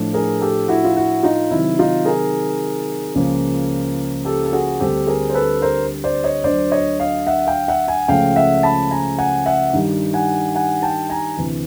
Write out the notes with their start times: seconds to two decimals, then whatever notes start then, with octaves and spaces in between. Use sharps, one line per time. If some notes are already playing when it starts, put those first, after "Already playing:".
Already playing: A2 F3 A3 D4
0.14 G#4 A#4
0.41 G4 A4
0.68 E4 F#4
0.85 F4
0.97 E4 F#4
1.23 D#4 F4
1.51 C3 D#3 F#3 E4
1.79 D#4 F4
2.05 G#4 A#4
3.15 C#2 C#3 F3 A#3
4.25 G4 A4
4.46 A4
4.53 F#4 G#4
4.80 D2 D3 G3 C4 G4 A4
5.07 G#4 A#4
5.30 C5
5.34 A4 B4
5.62 A#4 C5
6.04 C5 D5
6.24 C#5 D#5
6.44 D2 D3 F#3 C5 D5
6.71 C#5 D#5
7.00 D#5 F5
7.27 E5 F#5
7.47 F5 G5
7.68 E5 F#5
7.88 F#5 G#5
8.08 C#2 C#3 F3 A3 F5 G5
8.36 E5 F#5
8.63 A5 B5
8.91 G#5 A#5
9.18 F#5 G#5
9.46 E5 F#5
9.73 G2 D#3 G3
10.14 F#5 G#5
10.55 F#5 G#5
10.82 G5 A5
11.10 G#5 A#5
11.37 D2 C3 E3